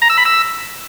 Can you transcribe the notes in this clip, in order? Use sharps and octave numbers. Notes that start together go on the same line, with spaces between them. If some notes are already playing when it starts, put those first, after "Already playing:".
A#5
E6
B5
E6